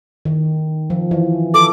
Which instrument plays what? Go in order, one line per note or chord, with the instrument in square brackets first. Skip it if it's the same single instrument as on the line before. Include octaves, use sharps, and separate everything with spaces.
[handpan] D#3
F3
E3
[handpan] A4 [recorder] D6